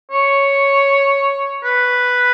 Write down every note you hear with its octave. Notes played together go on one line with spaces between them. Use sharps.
C#5
B4